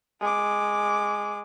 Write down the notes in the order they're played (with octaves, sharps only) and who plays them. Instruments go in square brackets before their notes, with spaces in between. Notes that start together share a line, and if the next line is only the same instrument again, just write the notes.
[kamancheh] G#3 D6